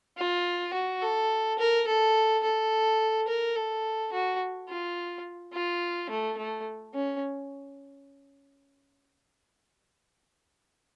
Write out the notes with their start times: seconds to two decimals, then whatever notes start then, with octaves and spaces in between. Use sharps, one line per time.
0.18 F4
0.73 F#4
1.02 A4
1.59 A#4
1.87 A4
2.44 A4
3.28 A#4
3.56 A4
4.12 F#4
4.69 F4
5.53 F4
6.10 A3
6.38 A3
6.94 C#4